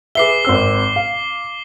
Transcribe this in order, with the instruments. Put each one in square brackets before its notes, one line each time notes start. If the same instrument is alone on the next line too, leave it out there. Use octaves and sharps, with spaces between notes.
[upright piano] G#4 B4 E5 [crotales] D6 C7 G7
[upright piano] G#1 C4 E6
F5